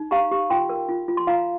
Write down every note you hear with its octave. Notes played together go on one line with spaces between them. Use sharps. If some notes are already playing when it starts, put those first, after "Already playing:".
Already playing: D#4
G4 F5 A#5
G4
F4 G5 C6
A#4
F4
F4
C6
F4 F5 A#5